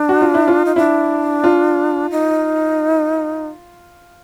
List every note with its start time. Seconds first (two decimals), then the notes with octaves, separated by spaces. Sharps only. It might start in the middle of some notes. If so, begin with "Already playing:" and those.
Already playing: D4
0.09 F#4
0.21 F4
0.34 E4
0.48 F4
0.65 D#4
0.76 D4 E4
1.44 F4
2.11 D#4